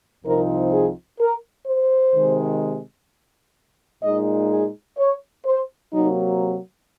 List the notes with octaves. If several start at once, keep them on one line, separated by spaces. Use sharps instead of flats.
C2 C3 F3 C4 D#4 A#4
G#4
A#4
C5
C3 D#3 G#3
A#2 G#3 D#4 D#5
G#4
C#5
C5
C3 F#3 A#3 D#4